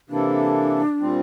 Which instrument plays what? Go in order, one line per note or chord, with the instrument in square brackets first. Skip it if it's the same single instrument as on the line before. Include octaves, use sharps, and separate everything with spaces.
[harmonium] C3 E3 A#3 E4 A4 [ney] D4
[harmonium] A#2 G3 C4